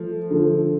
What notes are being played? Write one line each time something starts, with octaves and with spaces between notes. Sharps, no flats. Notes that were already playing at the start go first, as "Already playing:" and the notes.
Already playing: F3 A3
D3 F3 A3